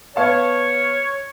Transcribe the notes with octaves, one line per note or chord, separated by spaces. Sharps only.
B3 C#5 F5 A5